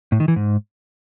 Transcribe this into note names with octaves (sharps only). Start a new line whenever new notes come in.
A2
D#3
E3
G#2